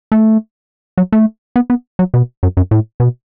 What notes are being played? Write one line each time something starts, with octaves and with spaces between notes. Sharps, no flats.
A3
F#3
A3
B3
B3
F#3
B2
F#2
F#2
A2
B2